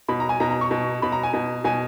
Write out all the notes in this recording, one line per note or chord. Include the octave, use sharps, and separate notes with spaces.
B2 B5
A#5
G#5
B2 A#5
A#5
C#6
B2
B2 B5
A#5
G#5
B2
B2 G#5